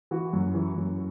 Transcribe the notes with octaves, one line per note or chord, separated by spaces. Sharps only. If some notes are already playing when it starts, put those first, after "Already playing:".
E3 F#4
F#2
E3
F#2